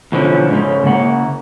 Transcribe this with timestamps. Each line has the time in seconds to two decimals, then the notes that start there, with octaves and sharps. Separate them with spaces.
0.12 E2 B2 D3 F3 C#4
0.50 G#2 C#3 C#4
0.84 C#3 A#3 F#5